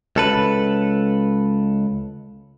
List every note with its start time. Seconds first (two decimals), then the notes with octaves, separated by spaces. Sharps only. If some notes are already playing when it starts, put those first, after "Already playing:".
0.16 C#2 A4 B4